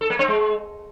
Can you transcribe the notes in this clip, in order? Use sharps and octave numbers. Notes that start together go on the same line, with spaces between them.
A4
A#3
C4
G#3